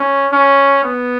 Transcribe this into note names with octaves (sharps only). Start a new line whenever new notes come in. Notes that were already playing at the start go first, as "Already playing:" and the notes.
Already playing: C#4
C#4
B3